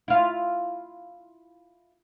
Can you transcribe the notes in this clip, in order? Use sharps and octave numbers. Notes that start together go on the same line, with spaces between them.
E4 F4